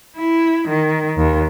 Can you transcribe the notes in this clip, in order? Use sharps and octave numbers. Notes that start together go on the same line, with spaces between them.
E4
D#3
D#2